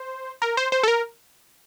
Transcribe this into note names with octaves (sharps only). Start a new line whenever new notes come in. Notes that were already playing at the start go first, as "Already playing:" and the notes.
Already playing: C5
A#4
C5
C5
A4
A#4